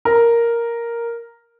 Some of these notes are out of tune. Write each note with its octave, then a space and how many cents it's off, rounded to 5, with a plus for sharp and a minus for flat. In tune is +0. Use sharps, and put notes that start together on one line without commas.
A#4 +0